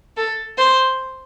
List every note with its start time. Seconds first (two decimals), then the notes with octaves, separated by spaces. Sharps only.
0.17 A4
0.58 C5